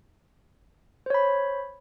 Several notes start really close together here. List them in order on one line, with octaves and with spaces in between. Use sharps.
C5 C#5 B5